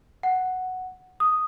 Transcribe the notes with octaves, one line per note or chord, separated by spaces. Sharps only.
F#5
D#6